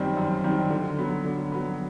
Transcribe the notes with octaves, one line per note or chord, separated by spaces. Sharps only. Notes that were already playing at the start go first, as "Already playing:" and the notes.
Already playing: F#2 D#3 G3 C4
F#2
D#3 G3 C4
D3
F#3 B3
D3
F#3 B3